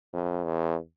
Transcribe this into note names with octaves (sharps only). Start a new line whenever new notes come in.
F2
E2